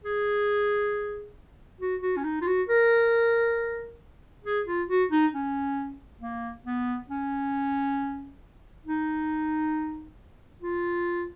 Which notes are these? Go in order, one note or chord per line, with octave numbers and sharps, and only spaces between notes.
G#4
F#4
F#4
C#4
D#4
F4
F#4
A#4
G#4
F4
F#4
D#4
C#4
A#3
B3
C#4
D#4
F4